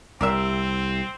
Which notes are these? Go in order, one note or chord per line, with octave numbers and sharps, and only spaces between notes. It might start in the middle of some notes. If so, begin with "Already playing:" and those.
C2 C4 G4 A#4 E5